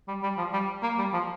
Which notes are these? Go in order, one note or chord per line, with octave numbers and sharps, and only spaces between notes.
G3
G3
F3
G3
A#3
G3
F3